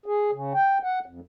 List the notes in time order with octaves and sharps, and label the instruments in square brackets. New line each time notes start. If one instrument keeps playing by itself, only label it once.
[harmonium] G#4
C#3
G5
F#5
F2